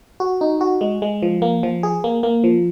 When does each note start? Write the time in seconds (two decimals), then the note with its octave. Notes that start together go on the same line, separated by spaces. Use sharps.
0.20 F#4
0.41 D#4
0.61 F#4
0.81 G#3
1.02 G#3
1.22 F3
1.42 A#3
1.63 F3
1.83 G#4
2.04 A#3
2.23 A#3
2.44 F3